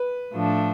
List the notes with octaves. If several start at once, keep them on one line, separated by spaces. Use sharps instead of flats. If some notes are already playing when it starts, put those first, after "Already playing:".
Already playing: B4
A2 F3 A3 D4